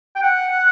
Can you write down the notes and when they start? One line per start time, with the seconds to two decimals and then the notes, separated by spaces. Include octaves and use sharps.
0.16 G5
0.22 F#5